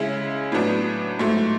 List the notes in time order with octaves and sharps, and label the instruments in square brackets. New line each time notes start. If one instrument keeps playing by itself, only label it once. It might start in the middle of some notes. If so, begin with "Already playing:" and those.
Already playing: [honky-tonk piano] C#3 G#3 C#4 E4
A2 F#3 B3 D4
G#2 F#3 A3